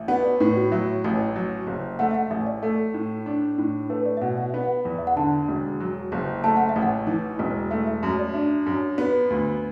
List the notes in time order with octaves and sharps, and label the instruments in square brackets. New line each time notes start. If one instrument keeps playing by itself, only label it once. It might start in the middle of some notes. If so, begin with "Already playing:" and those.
Already playing: [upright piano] A1 [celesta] E5
[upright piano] B3 [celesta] F#5
[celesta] D5
[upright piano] A2 [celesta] B4
[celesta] F#4
[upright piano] F#3 [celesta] E5
[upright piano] A1
F#3
F#1
[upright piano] A3 [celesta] F#5
[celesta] E5
F#5
[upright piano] A1 [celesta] E5
[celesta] D5
[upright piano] A3 [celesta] A4
[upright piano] A2
D4
A2
[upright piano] A3 [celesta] B4
[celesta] D5
E5
[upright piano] B2 [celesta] F#5
[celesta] F#5
[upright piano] B3 [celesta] E5
[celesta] F#5
[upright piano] E2
[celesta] E5
F#5
[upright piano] D3 [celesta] A5
[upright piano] E1
F#3
F#1
[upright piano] A3 [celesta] A5
[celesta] F#5
E5
[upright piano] A1
[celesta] F#5
[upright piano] E3
E1
[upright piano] A3 [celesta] E5
[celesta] E5
[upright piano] F#2
[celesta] D5
[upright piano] D4 [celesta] E5
[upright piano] F#2
B3
D2